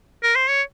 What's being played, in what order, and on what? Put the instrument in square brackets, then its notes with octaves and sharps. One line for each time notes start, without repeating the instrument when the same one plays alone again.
[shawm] A#4
C5
C#5